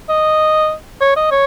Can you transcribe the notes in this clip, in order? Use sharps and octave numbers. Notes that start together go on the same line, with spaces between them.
D#5
C#5
D#5
C#5